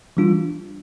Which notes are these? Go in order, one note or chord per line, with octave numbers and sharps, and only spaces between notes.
E3 G3 D4 F4